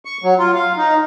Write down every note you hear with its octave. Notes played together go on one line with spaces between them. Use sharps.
C#6
F#3
F4
F5
D#4